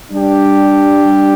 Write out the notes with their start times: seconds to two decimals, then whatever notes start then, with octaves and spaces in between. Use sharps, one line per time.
0.10 G3 D4 G4